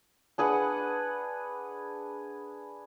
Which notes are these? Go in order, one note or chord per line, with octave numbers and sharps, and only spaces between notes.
D4 G#4 B4 F#5